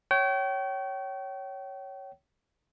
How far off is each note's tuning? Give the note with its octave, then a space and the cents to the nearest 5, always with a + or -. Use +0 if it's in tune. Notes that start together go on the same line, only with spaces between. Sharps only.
C#5 +0 G5 -35